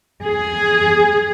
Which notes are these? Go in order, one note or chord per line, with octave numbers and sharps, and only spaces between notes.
G#4